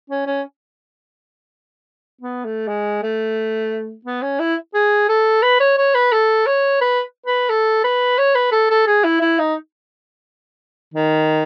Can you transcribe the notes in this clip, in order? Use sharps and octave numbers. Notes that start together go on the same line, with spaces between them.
C#4
C#4
B3
A3
G#3
A3
B3
C#4
E4
G#4
A4
B4
C#5
C#5
B4
A4
C#5
B4
B4
A4
B4
C#5
B4
A4
A4
G#4
E4
E4
D#4
D#3